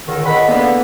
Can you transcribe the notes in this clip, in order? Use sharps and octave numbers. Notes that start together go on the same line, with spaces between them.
C#2 A#2 D3 D#3
C#2 D#5 F#5 B5
D3 E3 A#3 B3